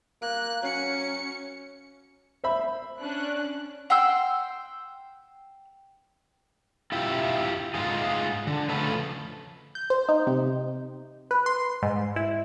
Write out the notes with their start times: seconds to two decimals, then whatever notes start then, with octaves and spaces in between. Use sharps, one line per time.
0.22 A#3 F#6
0.62 F#3 C#4 C#7
2.44 C5 E5 B5
3.01 C#4 D4 F#6
3.90 F#5 G5 C6 E6
6.92 E4 F4 G4 E5
7.74 G#2 G#3 F4 G#4
8.47 D3
8.69 C#3 F3 A3 F4 A4 B4
9.75 G6
9.90 C5
10.09 D#4
10.27 C3
11.31 B4
11.46 C6
11.83 G#2
12.16 E4